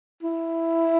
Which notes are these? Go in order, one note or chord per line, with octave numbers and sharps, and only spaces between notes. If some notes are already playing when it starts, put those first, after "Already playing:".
E4